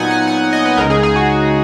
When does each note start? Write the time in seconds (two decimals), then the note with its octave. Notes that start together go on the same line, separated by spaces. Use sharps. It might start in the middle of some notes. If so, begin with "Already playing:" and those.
Already playing: A#2 F#3 B3 D#4 F#5 G#5
0.11 F#5
0.27 F#5
0.53 D#5
0.65 B4
0.77 C#2 C#3 G#3 D#4 A#4
0.90 G#4
1.03 G#4
1.16 F#4